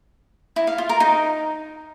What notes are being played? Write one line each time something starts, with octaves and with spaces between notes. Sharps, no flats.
E4
F5
F4
A#4
D#4